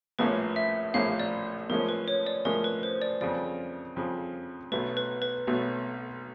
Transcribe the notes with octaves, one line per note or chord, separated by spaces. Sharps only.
A#1 A2 F3 A#3 C#4 B4
E5
A#1 A2 F3 A#3 C#4 F5
D5
A2 F3 G#3 C#4 A#4
B4
C#5
D5
A2 F3 G#3 C#4 A#4
B4
C5
D5
F2 C#3 F3 D5
F2 C#3 F3
B1 B2 F#3 A3 B4
B4
B4
B1 B2 F#3 A3